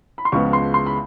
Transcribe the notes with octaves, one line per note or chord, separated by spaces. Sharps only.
B5
C6
C#2 C#3 F3 G#3 B3 C#6
C6
C6
B5